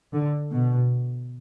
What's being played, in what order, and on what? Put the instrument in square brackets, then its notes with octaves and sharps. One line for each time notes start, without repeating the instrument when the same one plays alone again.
[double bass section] D3
B2